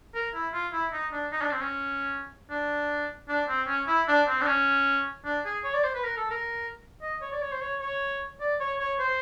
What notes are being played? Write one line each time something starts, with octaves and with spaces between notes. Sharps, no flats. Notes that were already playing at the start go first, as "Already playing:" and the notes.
A#4
E4
F4
E4
D#4
D4
D#4
D4
C4
C#4
D4
D4
C4
C#4
E4
D4
C4
D4
C#4
D4
G#4
C#5
D5
C5
B4
A#4
A4
A#4
D#5
C#5
D5
C#5
C5
C#5
C#5
D5
C#5
C#5
C5